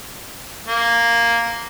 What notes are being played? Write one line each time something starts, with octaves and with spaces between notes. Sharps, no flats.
A#3